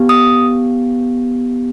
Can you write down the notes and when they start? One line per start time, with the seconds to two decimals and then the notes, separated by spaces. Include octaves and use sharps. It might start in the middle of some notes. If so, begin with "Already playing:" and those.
Already playing: B3 G4
0.09 D#6